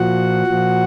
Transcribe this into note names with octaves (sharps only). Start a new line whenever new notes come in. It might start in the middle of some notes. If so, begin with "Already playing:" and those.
Already playing: A#2 F3 F#4 F#5
A#2 F3